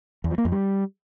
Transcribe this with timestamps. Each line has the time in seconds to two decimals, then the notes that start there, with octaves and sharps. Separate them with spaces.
0.24 E2
0.31 F3
0.38 A#3
0.45 F2
0.52 G3